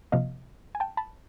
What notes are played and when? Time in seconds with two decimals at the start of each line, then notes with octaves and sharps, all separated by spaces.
0.12 C3 F3 A#3 D#5 F5
0.75 G#5
0.80 G5 A5
0.97 A5 B5